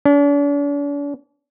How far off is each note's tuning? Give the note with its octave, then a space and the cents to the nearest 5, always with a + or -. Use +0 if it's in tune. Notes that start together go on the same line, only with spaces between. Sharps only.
D4 -45